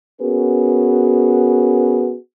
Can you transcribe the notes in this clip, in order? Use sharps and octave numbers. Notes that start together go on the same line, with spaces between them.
B3 C#4 F#4 G#4 A#4 B4